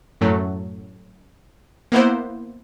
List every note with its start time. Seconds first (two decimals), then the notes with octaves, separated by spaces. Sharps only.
0.21 F#2 A2 F#3 A3
1.92 A#3 B3 E4 C5